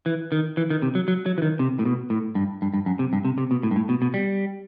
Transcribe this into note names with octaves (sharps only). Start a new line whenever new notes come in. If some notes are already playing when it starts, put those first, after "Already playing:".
E3
D#3
E3
D#3
C3
F#3
F#3
F#3
E3
D#3
C3
A2
B2
A2
G2
G2
G2
F#2
C3
G2
C3
C3
B2
A2
G2
A2
B2
B2
G3